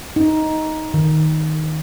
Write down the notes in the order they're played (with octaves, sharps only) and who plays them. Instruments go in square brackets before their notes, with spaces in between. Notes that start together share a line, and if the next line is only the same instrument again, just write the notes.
[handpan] D#4
D#3